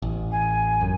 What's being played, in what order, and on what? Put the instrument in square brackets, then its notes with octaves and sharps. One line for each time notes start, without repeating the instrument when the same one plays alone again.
[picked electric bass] A1
[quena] G#5
[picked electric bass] F#2